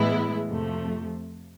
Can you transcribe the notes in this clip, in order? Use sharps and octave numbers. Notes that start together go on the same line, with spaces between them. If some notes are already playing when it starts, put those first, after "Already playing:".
Already playing: A2 E3 G#3 B3 E4
F2 C3 F3 A3